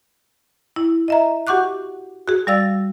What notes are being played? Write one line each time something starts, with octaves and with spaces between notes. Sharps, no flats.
E4
D#5 E5 A#5
F#4 G4 F#5 C#6 D6 F#6
F#4 G#4
G3 D5 F5 E6 A6